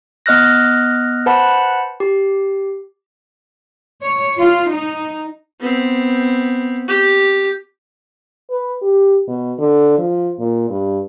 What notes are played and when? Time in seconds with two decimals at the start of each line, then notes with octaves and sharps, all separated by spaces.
0.26 B3 D#5 F6 F#6 A#6
1.26 B4 C5 F#5 A5 B5
2.00 G4
4.01 C#5
4.37 F4
4.69 D#4
5.60 B3 C4
6.88 G4
8.51 B4
8.82 G4
9.28 B2
9.59 D3
9.98 F3
10.39 A#2
10.70 G2